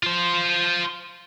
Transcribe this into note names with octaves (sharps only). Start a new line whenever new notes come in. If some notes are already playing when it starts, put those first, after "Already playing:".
F4 C5